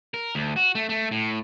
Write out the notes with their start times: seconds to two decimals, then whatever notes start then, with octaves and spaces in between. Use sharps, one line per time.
0.14 A#4
0.35 D2
0.56 F#4
0.75 A3
0.89 A3
1.11 A2